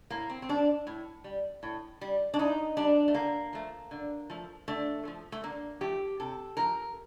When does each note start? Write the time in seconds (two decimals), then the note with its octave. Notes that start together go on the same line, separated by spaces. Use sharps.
0.10 A2 A#3
0.29 C4
0.42 C4
0.49 G3 D4
0.87 A2
1.24 G3
1.63 A2
2.01 G3
2.34 D4
2.39 A2 D#4
2.77 G3 D4
3.08 A3
3.14 D3 A#3
3.53 F3 A3
3.91 D3
4.30 F3 A3
4.68 D3 A3
5.05 F3 A3
5.32 A3
5.44 D3 A#3
5.81 F3 A3 G4
6.20 C3 A4
6.57 F3 A3 A#4